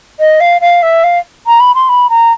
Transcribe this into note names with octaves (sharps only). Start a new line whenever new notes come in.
D#5
F5
F5
E5
F5
A#5
B5
C6
B5
A#5